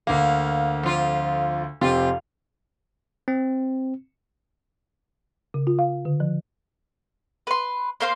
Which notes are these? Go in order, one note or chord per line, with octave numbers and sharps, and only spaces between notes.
D2 A#3 F5
F2 F4
F1 C4 F4 G4
C4
C#3
F4
F5
D3
F3
B4 C6
A#3 C5 F5 C6